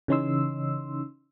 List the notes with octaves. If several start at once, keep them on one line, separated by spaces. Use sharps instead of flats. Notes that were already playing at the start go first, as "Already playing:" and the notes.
C#3 E3 C#4 D#4 C6 E6